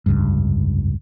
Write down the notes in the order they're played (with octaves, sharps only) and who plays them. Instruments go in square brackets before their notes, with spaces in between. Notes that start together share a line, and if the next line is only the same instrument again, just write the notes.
[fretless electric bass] F1 C#2 G2